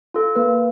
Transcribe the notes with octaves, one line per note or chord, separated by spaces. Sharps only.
F4 A4
A#3 B4